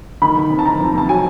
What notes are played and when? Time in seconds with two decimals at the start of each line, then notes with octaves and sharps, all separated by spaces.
0.22 D#3 B5
0.37 D#3
0.50 C3
0.59 A5
0.65 D#3 A#5
0.80 F2
0.94 C3 A5
1.09 F#3 G#5